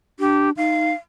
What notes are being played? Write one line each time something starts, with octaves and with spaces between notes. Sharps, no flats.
D4 G4
D#4 F5